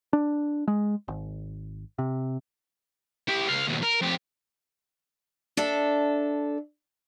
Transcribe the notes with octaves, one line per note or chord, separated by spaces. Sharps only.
D4
G#3
G#1
C3
E4 G4
C#2 F5
D#2 B2
A#4
F2 G4
D4 A4 E5